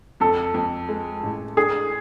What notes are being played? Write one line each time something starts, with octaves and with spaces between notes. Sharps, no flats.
F2 A4
F2
G#3
A1
D4 G#4